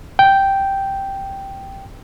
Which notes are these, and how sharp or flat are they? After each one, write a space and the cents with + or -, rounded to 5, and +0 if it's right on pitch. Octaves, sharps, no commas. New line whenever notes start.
G5 -5